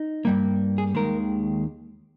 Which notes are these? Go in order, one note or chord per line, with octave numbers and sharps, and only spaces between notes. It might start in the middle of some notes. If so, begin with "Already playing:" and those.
Already playing: D#4
G2 G3 A#3
G#4
D#2 D#3 G#3 A#4